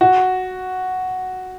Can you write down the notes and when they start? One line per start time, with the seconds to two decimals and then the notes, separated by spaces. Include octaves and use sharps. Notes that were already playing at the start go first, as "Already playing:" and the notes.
0.01 F#4